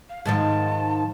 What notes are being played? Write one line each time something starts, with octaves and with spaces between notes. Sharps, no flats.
F5
G#2 D#3 F3 A5